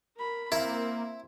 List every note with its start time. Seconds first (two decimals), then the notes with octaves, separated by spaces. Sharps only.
0.16 A#4 B5
0.52 A#3 C4 E4